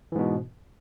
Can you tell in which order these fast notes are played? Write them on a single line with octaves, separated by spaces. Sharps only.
E3 G#2 B2